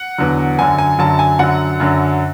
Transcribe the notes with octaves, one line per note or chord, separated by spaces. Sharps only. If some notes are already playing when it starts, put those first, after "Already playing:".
Already playing: F#5
E2 D3 F#3
F#2 D3 F#3 G#5
G#5
F#2 D3 F#3 A5
G#5
F#2 D3 F#3 F#5
F#2 D3 F#3